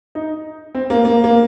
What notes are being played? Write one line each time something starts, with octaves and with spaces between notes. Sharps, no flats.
D#4
C4
A#3
A#3
A#3